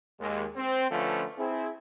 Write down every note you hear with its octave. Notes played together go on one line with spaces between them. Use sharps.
D#2 G#3
C4
D3 F3 A3 C#4 F4 B4
C4 E4 G#4